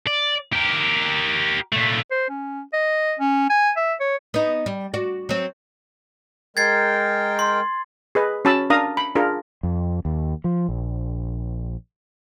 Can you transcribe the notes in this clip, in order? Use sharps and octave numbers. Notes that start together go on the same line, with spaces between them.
D5
G4 A#4
A#2 A3
C5
C#4
D#5
C#4
G#5
E5
C#5
B3 D#4
G3
F#4 D5
F#3 C4
G#3 A#4 G5 G#6 A6 C7
C6
G#4 B4 D#5
C#4 F#4 A5 B5 E6
D4 A#4 F5 A#5 D#6
B5
D4 F4 G#4 A#4
F2
D#2
F3
A#1